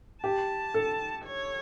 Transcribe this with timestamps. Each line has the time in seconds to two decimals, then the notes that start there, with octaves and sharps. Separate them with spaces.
0.23 G4 A5
0.74 A4
1.26 C#5